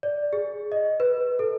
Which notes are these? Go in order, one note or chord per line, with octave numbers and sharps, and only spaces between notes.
D5
G#4
D#5
B4
A4